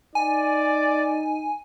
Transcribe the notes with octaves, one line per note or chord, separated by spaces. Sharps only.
D#4 D5 G#5